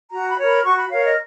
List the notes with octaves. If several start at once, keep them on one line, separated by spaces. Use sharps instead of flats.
F#4 A#5
B5
A#4 C#5
B5
F#4 C#6
B5
A#4 C#5 F5
D#5